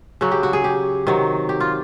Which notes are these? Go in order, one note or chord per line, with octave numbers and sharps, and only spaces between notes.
C#3 F#3 F#4
G4
F#4
G#4
G4
C3 D#3 F#3
G4
F4